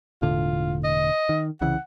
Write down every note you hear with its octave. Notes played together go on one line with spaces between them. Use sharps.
E1 A2 D3 F4
D#5
D#3
C2 C#3 E3 F#5